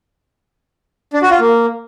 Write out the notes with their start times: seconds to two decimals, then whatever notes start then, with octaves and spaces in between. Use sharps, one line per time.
1.13 D4
1.22 F#4
1.31 F4
1.40 A#3